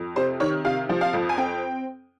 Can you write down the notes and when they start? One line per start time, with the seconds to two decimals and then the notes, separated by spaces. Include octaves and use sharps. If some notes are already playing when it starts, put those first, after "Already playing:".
Already playing: F2
0.16 C3 C5
0.40 D#3 C#5
0.65 C3 F5
0.89 F3
1.01 F5
1.13 F2
1.29 G#5
1.37 C4 G5